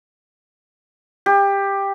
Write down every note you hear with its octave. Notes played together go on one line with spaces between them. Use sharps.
G4